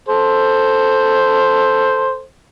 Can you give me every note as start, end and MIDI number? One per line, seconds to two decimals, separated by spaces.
0.09 2.22 69
0.09 2.22 72